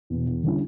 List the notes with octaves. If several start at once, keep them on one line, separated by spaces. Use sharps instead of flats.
E2 B2
E2
D3 G3 C#4 E4